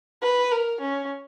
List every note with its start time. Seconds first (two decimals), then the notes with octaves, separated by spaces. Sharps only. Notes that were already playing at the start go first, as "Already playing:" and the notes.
0.22 B4
0.52 A#4
0.81 C#4